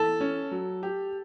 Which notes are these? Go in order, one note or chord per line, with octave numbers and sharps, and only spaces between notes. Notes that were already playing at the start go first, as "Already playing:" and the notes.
Already playing: E3 A4
C#4
F#3
G4